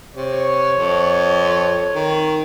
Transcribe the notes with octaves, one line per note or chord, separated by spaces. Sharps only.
C3 C#5
F2
D#3